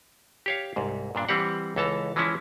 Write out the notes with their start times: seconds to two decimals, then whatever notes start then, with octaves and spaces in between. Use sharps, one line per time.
0.46 G4 C#5 F5
0.76 C2 G#2
1.15 G2 A#2 D4
1.29 E3 G3 C4 G4 F#5
1.76 C#2 E3 A4 A5 A#5
2.16 E3 F3 G#3 C#4 E4